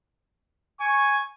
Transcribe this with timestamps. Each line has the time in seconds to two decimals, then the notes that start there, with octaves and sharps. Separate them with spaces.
0.80 G#5 C#6